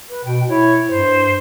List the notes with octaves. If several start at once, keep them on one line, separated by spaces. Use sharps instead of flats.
B4
B2 G5
E4 C#5
G2 C5